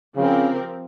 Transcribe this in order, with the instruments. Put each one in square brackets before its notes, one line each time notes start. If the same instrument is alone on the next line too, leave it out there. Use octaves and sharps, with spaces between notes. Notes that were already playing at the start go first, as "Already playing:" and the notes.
[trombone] C#3 [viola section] F3 C4 G4 A#4